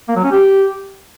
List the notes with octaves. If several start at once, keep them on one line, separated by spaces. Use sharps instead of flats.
A#3
F#3
C#4
G4